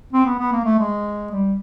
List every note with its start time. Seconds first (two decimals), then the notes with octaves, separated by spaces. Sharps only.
0.13 C4
0.26 B3
0.39 B3
0.52 A#3
0.65 A3
0.79 G#3
1.32 G3